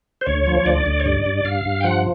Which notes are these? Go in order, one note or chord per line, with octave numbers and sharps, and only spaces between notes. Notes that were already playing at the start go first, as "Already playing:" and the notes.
C5
D2 C#5
F3
D2 D5
D2
C#5
G2 D5
G2
G2 F5
G2
G5
F3 F#5